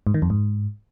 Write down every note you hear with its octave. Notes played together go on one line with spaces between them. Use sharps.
G#2
D#3
F2
G#2